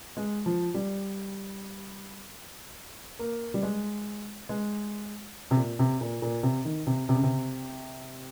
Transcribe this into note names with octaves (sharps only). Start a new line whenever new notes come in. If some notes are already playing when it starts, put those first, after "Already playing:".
G#3
F3
G3
A#3
G3
G#3
G#3
C3
A#2
C3
A#2
A#2
C3
D#3
C3
C3
C#3
C3